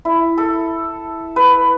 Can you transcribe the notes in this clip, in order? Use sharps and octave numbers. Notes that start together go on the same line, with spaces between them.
E4
A4
B4